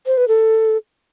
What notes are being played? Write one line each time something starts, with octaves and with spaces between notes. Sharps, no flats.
C5
B4
A4